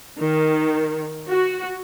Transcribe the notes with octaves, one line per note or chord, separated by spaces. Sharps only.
D#3
F#4